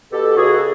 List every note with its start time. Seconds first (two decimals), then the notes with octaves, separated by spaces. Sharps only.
0.12 B2 G4 A4
0.35 C#2 F#4 G#4
0.52 A4